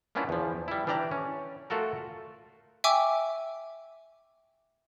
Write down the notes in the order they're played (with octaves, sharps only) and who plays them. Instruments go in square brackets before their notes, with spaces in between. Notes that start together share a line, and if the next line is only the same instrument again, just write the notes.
[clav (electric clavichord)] A#3 B3 C#4 D4 E4 F4
E2 F3
G3 E4
E3 D4 G4 D5 A#5
C#4
A3 F4 F#4 A4 A#4
[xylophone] E5 G5 G#5 C#6 D6 E6